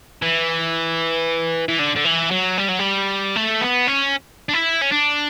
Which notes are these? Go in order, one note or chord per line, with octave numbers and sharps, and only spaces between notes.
E3
E3
D3
D3
E3
F#3
G3
F#3
G3
A3
B3
C#4
D4
E4
C#4
D4